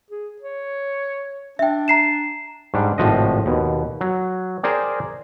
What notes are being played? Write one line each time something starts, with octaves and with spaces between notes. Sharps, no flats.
G#4
C#5
D4 E5 G5
A#5 C7 E7
G#2 G3 D4
G#1 A2 C3 F3 F#4 D#5
D#2 B2
F#3
G#4 A#4 C5 D5 G5